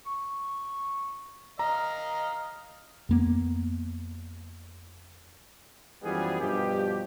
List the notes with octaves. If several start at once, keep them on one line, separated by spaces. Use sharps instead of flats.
C#6
D#5 F5 A#5
F2 A#3 B3
F#2 E3 F3 G3 B3 G#4
G2 B2 F3 G4